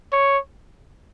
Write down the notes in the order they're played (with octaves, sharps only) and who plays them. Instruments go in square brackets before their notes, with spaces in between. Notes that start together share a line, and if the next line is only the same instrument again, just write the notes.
[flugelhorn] C#5